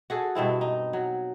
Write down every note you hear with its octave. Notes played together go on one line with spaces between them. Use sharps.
F#4 G#4 A4
G2 B2 C4 E4
D#4
F#3